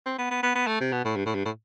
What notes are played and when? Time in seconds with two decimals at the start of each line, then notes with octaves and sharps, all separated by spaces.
0.06 C4
0.18 B3
0.31 B3
0.43 B3
0.55 B3
0.67 A3
0.80 C3
0.92 B2
1.05 A2
1.17 G2
1.26 A2
1.35 G2
1.45 A2